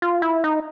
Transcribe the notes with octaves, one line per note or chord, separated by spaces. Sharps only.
F4
E4
D#4